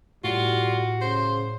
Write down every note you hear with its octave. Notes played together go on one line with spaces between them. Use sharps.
A2 G3 F4 F#4
C#3 C5